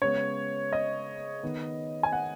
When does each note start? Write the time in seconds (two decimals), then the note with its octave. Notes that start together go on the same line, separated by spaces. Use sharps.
0.02 C#3 G#3 B3 C#5
0.73 D#5
1.43 D#3 B3
2.03 G#5
2.13 F#5